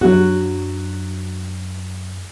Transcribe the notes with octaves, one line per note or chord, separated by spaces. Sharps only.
F#2 F#3 D4 F#4